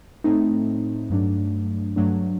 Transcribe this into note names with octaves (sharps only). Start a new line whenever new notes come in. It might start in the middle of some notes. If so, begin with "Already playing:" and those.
A2 A3 C4 D#4
G2 F#3 A3 D4
G2 F#3 A3 D4